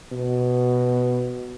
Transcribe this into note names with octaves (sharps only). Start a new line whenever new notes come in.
B2